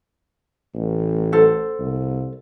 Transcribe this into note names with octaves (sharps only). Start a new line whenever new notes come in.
A1
A4 C5 F#5
C2